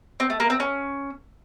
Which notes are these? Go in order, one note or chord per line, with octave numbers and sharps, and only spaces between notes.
C4
A3
A#3
C4
C#4